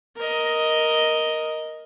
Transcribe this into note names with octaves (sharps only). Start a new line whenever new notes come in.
A#4 D#5